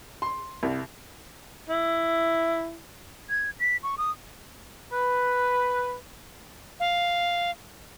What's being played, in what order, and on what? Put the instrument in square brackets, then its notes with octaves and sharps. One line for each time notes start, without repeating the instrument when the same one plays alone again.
[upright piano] C6
C2
[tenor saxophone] E4
[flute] G#6
B6
C#6
D#6
[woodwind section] B4
[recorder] F5